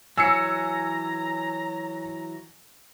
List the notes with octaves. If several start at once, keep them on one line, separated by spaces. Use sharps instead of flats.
E3 F#3 G#5 A#5 E6 C#7